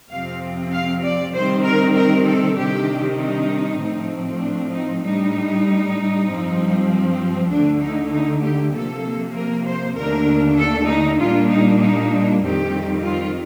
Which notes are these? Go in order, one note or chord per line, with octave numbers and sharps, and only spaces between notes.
F2 C3 F3 C4 F5
F5
D5
C3 D#3 G3 C4 C5
A#4
A#4
A4
C3 D#3 G3 D4 G4
D#4
A2 F3 A3 C4
D4
D#4
A2 G3 D4 D#4
G2 F3 C4
D2 D3 A3 D4
D#4
D#4
G4
C3 F3 A#3 A4
A#4
C5
D#2 D3 A3 D4 A#4
A4
D#4
A#2 G3 A#3 D4 F4
D#4
D#4
F2 D#3 G3 C4 G4
F4